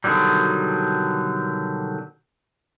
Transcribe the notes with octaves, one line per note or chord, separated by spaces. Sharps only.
B2 D3 D#3 F#3 G3